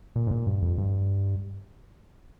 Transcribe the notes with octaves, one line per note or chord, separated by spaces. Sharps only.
A#2
G#2
A#2
G2
F2
G2